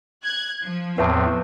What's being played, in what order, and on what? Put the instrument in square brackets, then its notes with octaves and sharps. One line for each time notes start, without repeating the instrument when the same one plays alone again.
[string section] F#6 G#6
F3
[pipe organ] E2 A2 C4 [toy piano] B4 E5 A5